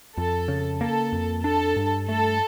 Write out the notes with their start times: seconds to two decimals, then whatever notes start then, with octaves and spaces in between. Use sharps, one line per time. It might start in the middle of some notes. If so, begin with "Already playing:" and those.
0.17 F2 A4
0.48 C#3
0.80 A#3 A4
1.12 F2
1.44 D4 A4
1.76 G2
2.08 A3 A4